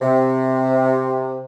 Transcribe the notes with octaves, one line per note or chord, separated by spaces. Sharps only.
C3